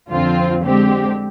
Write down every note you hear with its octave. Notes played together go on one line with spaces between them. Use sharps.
F2 D3 F3 C4 F4
D3 G#3 C4 G4